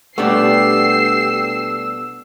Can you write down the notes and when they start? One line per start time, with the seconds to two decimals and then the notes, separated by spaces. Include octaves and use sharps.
0.18 B2 G3 A3 B3 D4 G4 E6 C7